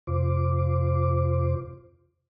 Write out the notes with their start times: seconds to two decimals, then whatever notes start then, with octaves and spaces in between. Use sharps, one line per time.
0.07 F2 C3 F4 C5 D6